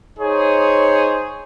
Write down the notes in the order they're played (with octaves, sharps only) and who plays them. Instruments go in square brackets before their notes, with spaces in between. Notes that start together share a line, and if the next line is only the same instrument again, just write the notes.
[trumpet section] D#4 G#4 C5 C#5